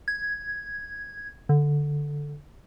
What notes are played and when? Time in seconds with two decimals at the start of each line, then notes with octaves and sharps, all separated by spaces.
0.08 G#6
1.49 D3